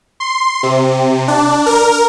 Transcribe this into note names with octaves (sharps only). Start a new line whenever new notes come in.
C6
C3
D4
A#4